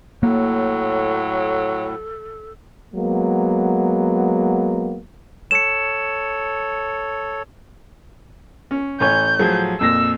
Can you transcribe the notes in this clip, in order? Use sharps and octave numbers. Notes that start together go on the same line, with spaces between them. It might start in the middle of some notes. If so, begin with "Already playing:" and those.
A2 F#3 A#3 A4
F#3 G#3 A#3 B3
A4 C#5 C#7 E7
C#4
A1 C#5 G#5 G6
A2 F3 F#3 G#4
F2 A#2 E6 A#6